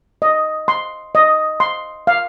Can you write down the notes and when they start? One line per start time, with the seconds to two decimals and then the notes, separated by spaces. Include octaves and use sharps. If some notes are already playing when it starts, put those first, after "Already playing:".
0.22 D#5
0.68 C6
1.15 D#5
1.60 C6
2.07 F5